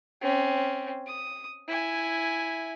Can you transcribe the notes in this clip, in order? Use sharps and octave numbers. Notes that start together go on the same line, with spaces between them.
C4 C#4
D#6
E4 G#5